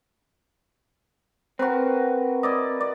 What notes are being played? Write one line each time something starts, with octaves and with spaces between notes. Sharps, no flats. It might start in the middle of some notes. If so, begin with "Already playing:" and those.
C4 F#4 A#4 B4
E4 D5 D#5
D5